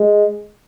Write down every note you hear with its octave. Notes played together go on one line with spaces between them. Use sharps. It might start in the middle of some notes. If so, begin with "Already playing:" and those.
Already playing: G#3